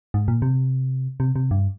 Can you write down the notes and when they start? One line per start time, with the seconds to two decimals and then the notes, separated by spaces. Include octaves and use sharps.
0.14 G#2
0.28 A#2
0.42 C3
1.20 C3
1.36 C3
1.51 G2